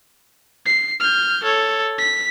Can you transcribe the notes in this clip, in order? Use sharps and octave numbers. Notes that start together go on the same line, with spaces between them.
C7
F6 G6
A4 C#5
B6